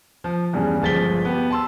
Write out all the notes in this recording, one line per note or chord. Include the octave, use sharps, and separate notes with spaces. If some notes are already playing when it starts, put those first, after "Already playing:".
F3
E2 G2 C#3
G1 F3 G#3 A6 B6 G7
B3 G4
A5 C6 E6